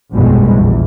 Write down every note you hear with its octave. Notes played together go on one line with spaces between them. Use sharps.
F1 A#1 G2 B2 G3 G#3
A#1 E2